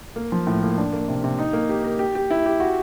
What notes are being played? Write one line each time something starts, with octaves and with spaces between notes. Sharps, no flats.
A#3
F3
A2
A#3
D4
A#3
C3
C3
D#4
A#3
G4
A#4
G4
G4
E4
G4
F#4